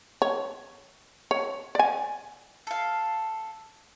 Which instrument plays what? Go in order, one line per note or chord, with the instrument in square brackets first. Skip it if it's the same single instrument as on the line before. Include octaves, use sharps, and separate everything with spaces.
[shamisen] C#5
C#5
D5 G#5
[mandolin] A4 F5